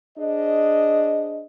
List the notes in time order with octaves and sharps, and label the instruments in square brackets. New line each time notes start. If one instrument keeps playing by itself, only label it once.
[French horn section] D4 G#4 C5 D#5